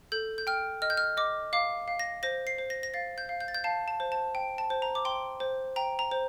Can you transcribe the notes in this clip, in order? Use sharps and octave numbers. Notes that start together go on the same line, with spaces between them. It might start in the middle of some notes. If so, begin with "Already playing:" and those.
A4 G6
G6
G5 F6
D#5 F6
G6
F6
D#5 D6
F5 D6
F5
A#6
C5 A#6
C7
C5
A#6
A#6
F5 A6
G6
F5
G6
A6
G6
F5 A5
A5
C5
A5
G5
A5
C5
A#5
D6
G5 C6
C5
G5 A#5
A#5
C5